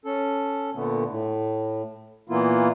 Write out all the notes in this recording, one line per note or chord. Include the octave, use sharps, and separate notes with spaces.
C#4 A4
A#2 D3 A3 B3
A2
A#2 E3 A#3 B3 E4 F4